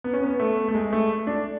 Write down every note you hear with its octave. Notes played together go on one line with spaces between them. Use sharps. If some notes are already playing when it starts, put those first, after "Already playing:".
B3
C#4
B3
A3
A3
G#3
A3
D4